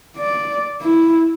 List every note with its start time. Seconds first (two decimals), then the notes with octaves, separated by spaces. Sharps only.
0.18 D5
0.82 E4